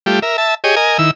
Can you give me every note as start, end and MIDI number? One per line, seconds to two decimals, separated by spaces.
0.06 0.19 55
0.06 0.19 57
0.06 0.19 65
0.06 0.19 67
0.22 0.37 70
0.22 0.37 76
0.38 0.54 76
0.38 0.54 81
0.64 0.75 67
0.64 0.75 68
0.64 0.75 73
0.64 0.75 75
0.76 0.98 70
0.76 0.98 75
0.76 0.98 80
0.98 1.11 51
0.98 1.11 64
0.98 1.11 88